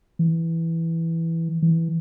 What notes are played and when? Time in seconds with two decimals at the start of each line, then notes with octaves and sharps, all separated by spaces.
0.19 E3
1.62 E3